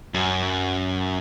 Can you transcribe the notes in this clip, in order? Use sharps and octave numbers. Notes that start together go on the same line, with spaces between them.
F#2